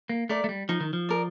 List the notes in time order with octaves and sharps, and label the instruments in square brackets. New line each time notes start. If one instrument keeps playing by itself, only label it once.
[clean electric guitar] A#3
[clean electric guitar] A3 [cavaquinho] A#4 D5
[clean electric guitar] A3
G3
[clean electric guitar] F3 [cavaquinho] D#4
[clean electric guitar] D#3
F3
[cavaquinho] A#4 D5